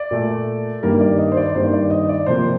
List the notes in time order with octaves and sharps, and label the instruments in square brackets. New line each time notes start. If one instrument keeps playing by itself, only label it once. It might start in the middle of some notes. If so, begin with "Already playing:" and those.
Already playing: [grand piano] D5
A#2 A3
G2 D#3 G3 A#3 A#4
D5
D#5
C5
D5
D5
G2 D#3 G3 A#3 C5
D5
D#5
D5
C3 F3 A#3 C5